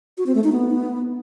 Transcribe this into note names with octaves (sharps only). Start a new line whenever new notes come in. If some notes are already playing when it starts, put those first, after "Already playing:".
F#4
C4
A3
D#4
B3